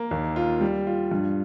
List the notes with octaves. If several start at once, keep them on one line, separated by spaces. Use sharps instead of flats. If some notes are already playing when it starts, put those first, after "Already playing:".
Already playing: A#3
D#2
F4
G3
F4
G2